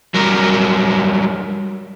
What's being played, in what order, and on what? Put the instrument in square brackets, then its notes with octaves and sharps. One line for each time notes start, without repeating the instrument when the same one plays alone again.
[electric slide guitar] F#3 G3 A#4